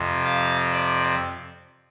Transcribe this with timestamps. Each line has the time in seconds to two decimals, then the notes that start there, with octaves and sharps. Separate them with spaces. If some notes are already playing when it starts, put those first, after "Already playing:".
Already playing: F2 C3
0.25 F5
0.71 D5